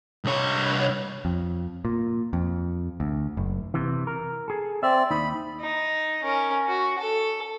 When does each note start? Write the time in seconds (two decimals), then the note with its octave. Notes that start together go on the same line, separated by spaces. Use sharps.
0.25 C2 C#5
1.25 F2
1.85 A#2
2.33 F2
3.00 D2
3.37 F#1
3.74 C3 E3
4.07 A#4
4.48 G#4 A4
4.83 C4 D5 E5
5.11 D#2 D#4 B5
5.60 D#4
6.23 C#4 A#4
6.68 F#4
6.99 A4